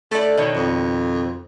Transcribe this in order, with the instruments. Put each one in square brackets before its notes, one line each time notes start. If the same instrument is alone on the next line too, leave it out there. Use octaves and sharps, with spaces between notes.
[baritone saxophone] A3 [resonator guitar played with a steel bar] A4 D5
[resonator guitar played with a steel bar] B2 D#3 C#5
[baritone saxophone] F2